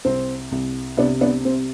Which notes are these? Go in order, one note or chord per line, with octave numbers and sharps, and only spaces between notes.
C2 C4
C2
C3 B3 D4
B3 D4
C3 C4